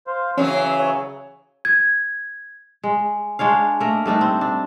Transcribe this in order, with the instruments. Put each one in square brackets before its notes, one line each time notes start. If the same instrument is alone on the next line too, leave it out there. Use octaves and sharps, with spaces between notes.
[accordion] C5 F5
[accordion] C#3 [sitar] E3 F#3 [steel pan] C#4
[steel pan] C#5
[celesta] G#6
[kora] G#3
G#3 D4 C#5 F5
A3 A#3 A#4
G3 A3 D4 D#4
C4
D4